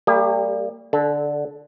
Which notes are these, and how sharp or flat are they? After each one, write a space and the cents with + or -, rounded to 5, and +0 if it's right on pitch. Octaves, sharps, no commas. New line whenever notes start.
G3 +0 A#3 -35 G4 +40
D3 +0 A4 -20